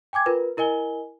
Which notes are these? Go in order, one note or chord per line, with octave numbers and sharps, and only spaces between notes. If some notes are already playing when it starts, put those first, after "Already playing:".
G5 G#5 D6 G#6
F4 A#4 B4
E4 A#4 D#5 G#5 G7